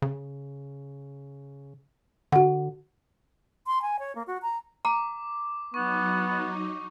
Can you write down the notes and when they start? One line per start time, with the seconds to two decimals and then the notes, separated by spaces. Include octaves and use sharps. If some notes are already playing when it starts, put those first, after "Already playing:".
0.02 C#3
2.32 D3 F#4 F#5
3.67 C6
3.82 G#5
3.99 C#5
4.15 A#3
4.27 F#4
4.42 A#5
4.85 A#5 D6
5.74 F#3 B3 D#4 C#6